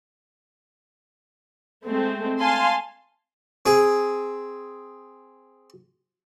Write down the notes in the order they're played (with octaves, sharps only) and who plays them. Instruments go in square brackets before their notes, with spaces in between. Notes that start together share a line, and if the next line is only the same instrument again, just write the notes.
[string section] G#3 A3 C4
F5 G#5 A5 C6
[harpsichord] C4 G#4